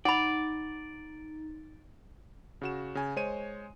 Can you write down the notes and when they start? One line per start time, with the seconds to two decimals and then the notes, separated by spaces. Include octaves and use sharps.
0.05 D#4 D5 F#5 B5
2.61 C#3 F#4 E7
2.95 C#3 G#5
3.16 G#3 C5 C#5 G#5 D#7